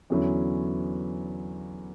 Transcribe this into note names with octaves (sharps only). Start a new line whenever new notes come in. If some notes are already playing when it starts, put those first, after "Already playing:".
E2 D3 F#3 C#4 E4